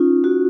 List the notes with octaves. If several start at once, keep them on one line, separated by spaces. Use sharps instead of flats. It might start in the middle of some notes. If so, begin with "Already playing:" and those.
Already playing: C#4 D#4 F4
F#4